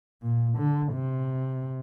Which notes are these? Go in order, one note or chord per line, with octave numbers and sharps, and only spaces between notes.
A#2
D3
C3